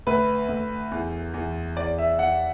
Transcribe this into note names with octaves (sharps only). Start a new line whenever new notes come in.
D2 B4
D2
E2
E2
E2 D5
E5
E2 F#5